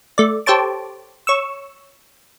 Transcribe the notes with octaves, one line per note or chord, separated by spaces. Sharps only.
A3 D5
G4 A4 C5 C#5 A5 D6
C#5 C#6 E6